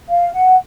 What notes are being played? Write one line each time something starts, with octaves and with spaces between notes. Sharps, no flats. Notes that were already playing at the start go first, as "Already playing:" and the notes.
F5
F#5